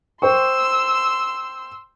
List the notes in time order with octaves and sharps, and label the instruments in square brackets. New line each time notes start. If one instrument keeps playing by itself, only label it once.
[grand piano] C5 G5 C#6 [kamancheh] C6 E6